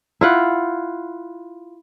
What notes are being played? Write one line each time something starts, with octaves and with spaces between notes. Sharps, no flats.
E4 F4 F#5